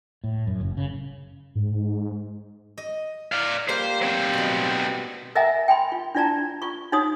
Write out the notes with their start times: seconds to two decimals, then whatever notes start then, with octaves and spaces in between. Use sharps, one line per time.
0.24 A2
0.47 F#2
0.61 F#1
0.77 C#3
1.55 G#2
2.78 D#5
3.32 D5 F5
3.69 G3 A#3 F4 C5
4.02 F#3 C4
4.33 B2 B3
5.35 A#4 D#5 E5 F#5 G#5 A#5
5.68 G5 G#5 B5 C6
5.92 F4
6.15 D4 E4 F4 D5 A5 A#5
6.62 F4 C#6
6.92 D#4 F#4 C#5 D#6